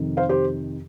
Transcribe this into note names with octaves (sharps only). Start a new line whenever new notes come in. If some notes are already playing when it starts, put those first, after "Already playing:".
Already playing: F2 C3 D#3
C5 F5
G4 C5